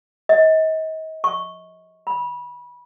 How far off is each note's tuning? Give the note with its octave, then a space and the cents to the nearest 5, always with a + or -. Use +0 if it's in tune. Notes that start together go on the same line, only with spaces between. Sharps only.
D#5 +35
C#6 -10
B5 -25